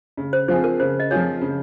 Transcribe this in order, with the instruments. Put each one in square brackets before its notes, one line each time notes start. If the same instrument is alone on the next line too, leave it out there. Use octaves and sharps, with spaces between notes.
[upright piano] C#3
[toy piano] C5
[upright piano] F3 C4 F4 G#4 [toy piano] C5
[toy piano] A#4
[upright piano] C#3 [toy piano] C5
[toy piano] D#5
[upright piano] F3 C4 F4 G#4 [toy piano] C#5
[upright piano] C#3